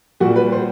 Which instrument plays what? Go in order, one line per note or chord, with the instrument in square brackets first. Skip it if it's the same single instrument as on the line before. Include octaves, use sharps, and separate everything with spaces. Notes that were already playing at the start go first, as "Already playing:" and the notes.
[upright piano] A#2 G3 F#4
B4
C5